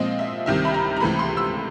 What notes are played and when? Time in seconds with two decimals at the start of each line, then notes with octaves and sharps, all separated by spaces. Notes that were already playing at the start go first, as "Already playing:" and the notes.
Already playing: A#2 F3 G#3 C4 D#5
0.19 E5
0.46 C2 C3 D#3 E5
0.65 B5
0.74 A#5
0.96 A#5
1.00 C#2 C3 E3 A3 B5
1.19 C6
1.37 E6